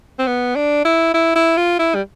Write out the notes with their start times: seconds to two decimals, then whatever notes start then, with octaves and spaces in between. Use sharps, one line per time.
0.19 C4
0.27 B3
0.56 D4
0.85 E4
1.14 E4
1.36 E4
1.57 F4
1.79 E4
1.95 G3